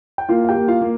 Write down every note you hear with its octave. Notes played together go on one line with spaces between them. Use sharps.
G5
A#3 F4 F5
F5
G4 G5
A#3
F4 F5
A#3